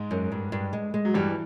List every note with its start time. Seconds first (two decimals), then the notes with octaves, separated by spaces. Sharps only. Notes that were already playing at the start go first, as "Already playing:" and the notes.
Already playing: G#2 G#3
0.11 F#2
0.32 G2
0.52 G2
0.73 G#3
0.94 G#3
1.05 F#3
1.14 G2 E3 G3